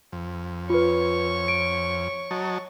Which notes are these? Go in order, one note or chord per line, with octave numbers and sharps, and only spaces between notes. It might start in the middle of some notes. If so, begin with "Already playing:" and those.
F2
F4 B4 C#5 C#6
D7
F#3 D#5 A5